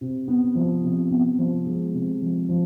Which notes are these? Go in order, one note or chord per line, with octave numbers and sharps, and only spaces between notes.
C3
B3
F3
C3
B3
F3
G#3
C3
F3
F3